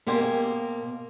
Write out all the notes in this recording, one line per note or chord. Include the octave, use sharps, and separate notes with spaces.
B2 A#3 G4 C5 G#5